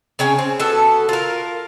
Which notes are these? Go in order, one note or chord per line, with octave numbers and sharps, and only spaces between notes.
C#3 C#4 G5 G#5
C4
B3 F#4 A4
F4 A#4